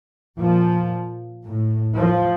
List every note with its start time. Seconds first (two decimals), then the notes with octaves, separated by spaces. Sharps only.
0.39 A#2 F3
1.44 A2
1.95 F3